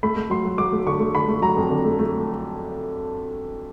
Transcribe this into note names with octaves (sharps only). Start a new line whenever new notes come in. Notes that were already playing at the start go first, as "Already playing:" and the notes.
A3 B5
A3
F#3 C6
F#3
F#3 D6
A3
D3 C#6
A3
D3 B5
A3
F#3 A#5
F2
D3
A3
A3